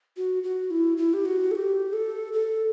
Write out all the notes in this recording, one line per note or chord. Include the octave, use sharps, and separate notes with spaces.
F#4
F#4
E4
E4
G4
F#4
A4
G4
A4
A4